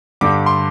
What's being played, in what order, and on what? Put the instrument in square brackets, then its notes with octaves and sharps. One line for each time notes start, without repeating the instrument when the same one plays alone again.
[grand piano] G2 D3 G3 D6
C6